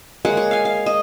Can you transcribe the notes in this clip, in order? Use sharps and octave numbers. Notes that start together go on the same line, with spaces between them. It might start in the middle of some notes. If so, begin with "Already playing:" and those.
G#3 A#3 C#5 F#5
C#5
F5 G#5
F5
D#5